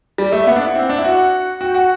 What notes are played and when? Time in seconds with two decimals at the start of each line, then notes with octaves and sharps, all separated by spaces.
0.18 G3 D5
0.32 A3 E5
0.47 B3 F#5
0.56 D4
0.66 E4
0.75 C4
0.89 D4
0.98 E4
1.04 F#4 F#5
1.61 F#4 G5
1.74 F#4 F#5